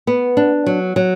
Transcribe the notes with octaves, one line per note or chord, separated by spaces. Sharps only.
B3
D4
F#3
F#3